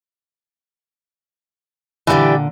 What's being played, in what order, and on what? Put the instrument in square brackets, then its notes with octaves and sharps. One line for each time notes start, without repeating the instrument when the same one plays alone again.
[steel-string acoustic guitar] A#2 D3 [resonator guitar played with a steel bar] E3 G3 G4